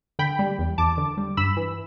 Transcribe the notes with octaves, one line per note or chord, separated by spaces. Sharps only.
D3 G5 B5
G3
E2
E2 A5 D6
D3
G3
G2 B5 E6
E3